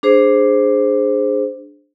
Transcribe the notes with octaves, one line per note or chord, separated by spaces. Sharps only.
D4 G#4 C5